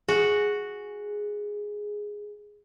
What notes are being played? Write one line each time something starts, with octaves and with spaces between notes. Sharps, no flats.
F#4 G#4